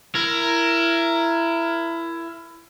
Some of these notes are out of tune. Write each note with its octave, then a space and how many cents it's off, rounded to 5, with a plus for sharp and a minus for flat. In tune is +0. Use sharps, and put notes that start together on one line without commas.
E4 +20 A#4 +0